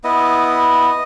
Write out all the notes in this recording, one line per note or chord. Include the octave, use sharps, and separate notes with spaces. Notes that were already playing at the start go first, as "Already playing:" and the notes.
B3 E4 D#5